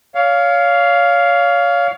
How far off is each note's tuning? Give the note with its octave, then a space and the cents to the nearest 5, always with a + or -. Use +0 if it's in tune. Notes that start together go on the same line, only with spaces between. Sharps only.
C#5 +30 F5 +0